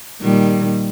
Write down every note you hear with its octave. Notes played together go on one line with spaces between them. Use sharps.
A#2 D#3 G3